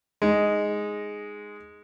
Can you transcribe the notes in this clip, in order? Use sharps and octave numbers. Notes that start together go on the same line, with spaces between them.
G#3 D#4